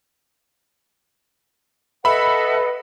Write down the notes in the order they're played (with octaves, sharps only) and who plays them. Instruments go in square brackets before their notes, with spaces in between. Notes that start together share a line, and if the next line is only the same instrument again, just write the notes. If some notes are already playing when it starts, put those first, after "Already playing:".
[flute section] A4 D#5 F#5 [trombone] B4 [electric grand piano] E5 B5